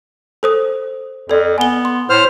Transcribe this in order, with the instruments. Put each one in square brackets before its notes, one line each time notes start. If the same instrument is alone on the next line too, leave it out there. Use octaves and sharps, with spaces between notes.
[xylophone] A4 C5 D#6
[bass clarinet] F2 [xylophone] A4 D5
[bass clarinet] B3 [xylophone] G#5 G7
[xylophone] C6
[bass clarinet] A2 [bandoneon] C5 F6